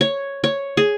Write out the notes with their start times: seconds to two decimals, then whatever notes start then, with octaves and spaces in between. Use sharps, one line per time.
0.01 C#5
0.44 C#5
0.77 G#4